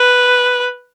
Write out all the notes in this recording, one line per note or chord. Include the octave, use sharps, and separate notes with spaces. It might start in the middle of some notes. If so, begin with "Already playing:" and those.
Already playing: B4